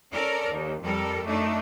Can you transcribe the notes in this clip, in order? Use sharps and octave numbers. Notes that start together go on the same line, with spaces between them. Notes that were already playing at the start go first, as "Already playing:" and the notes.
C#4 A4 A#4 D5
D#2
F2 G3 A4 A#4
F#2 A3 D4 D#4